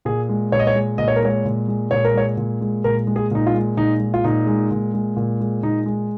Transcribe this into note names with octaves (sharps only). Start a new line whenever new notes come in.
A#2 G#4
G#3
A#2 C#5
D#5
C#5
G#3
A#2 D#5
C#5
A#4
G#3 C#5
A#2
G#3
A#2 C#5
A#4
G#3 C#5
A#2
G#3
A#2 A#4
G#3
G#4
A#2 D#4
F4
G#3
A#2 D#4
G#3
F4
A#2 D#4
G#3
A#2
G#3
A#2
G#3
A#2 D#4
G#3